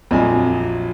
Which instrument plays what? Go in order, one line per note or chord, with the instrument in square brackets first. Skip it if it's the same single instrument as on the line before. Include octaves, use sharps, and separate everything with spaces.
[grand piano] A#1 F#3 G#5 [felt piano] F2